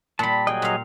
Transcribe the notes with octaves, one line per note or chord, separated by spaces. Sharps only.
A#2 G3 A5 B5
F#3 G#4 D#5 G5
A#2 F5